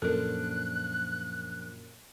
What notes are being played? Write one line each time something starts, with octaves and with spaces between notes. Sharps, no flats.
F#2 A#2 F3 D4 A4 A#4 F#6